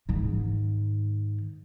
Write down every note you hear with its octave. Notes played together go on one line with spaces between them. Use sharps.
G#2 D#3